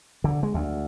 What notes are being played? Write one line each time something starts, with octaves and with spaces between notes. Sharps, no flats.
D3
G#3
D2